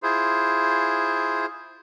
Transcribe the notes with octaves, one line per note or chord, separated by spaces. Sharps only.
E4 F4 G#4 C5